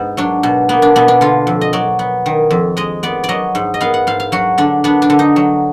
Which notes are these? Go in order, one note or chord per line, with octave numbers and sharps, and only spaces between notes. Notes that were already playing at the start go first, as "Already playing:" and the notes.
Already playing: G#2 B3
F#3 D4
B2
A#3 B3
D4
B2 B3
D4
D3 F4
F2
D#5
F#3 D5
B3
D#3
F2
G#3 D#5
B3 D5
D5
F#3 D#5
G#2
D#5
B3 F5
F#5
G#2 F5
F5
F#3 F#4
D3 D4
B3 D4
D4
D3
D#4
F#3